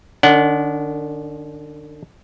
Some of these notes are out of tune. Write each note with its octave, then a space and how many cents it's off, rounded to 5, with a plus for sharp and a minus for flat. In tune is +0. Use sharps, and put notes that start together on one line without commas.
D3 +45 D4 -35 F#5 +0